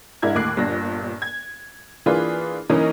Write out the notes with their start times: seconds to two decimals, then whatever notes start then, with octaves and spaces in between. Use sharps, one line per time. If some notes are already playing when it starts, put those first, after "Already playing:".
0.22 G#2 D4 E4 A#4 G#6
0.35 D#2 A2 D6 F#6 C7
0.56 G1 G2 A#2 A#6
1.22 G#6
2.06 E3 A#3 D4 F4 G#4 B4
2.69 E3 A#3 C#4 D#4 A#4 D#5